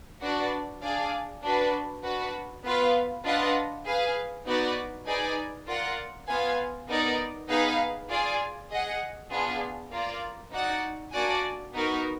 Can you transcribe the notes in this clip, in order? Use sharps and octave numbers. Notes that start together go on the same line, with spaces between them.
D4 F#4 B4 D5
D4 G#4 D5 F5 G#5
D4 F#4 B4
D4 F#4 B4
B3 F4 B4 F5
D4 F4 B4 D#5 F#5
G#4 B4 F5 G#5
B3 D#4 F#4 B4 D5
D#4 G#4 B4 D5 G#5
F4 A#4 D5 F#5
B3 F4 B4 F5 G#5
B3 D#4 A#4 D5
B3 D#4 G#4 B4 F5
F4 G#4 D5 G#5
G#4 D#5 F#5
B3 D4 F4 G#4
A#3 F4 A#4 D5
D#4 F#4 D5 F#5
A#3 D4 F#4 D5 G#5
B3 D#4 F#4 A#4